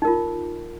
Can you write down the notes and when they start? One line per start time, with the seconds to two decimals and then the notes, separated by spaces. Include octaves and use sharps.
0.02 D#4
0.05 A#4
0.07 F4